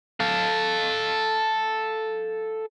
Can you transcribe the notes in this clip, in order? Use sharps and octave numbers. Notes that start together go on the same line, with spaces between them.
A4 F5